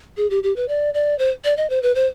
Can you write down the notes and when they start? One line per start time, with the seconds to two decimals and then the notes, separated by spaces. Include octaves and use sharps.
0.17 G#4
0.30 G4
0.43 G4
0.56 B4
0.68 D5
0.94 D5
1.19 C5
1.44 D5
1.57 D#5
1.70 C5
1.83 B4
1.95 C5